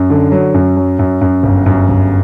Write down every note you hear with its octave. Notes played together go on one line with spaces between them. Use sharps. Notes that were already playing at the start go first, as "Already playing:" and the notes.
Already playing: F#2
D3
F#3
F#2
F#3
F#2
F#2
G1
F#2
G1